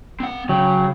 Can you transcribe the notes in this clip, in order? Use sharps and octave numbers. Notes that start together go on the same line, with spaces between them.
C4 F#5
C#3 F#3 G5